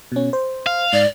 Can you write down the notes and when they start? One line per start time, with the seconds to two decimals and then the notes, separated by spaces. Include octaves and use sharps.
0.12 B2 C#4
0.33 C5
0.66 F5
0.93 G#2 D5